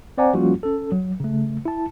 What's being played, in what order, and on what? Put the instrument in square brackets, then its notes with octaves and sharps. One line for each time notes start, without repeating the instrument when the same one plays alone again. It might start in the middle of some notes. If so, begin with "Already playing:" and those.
[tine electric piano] C4 C5 D5 F#5 G#5 A#5
F3 G3 A#3 C#4 F4 F#4
C#4 A4
F#3
C#3 A3
E4 A5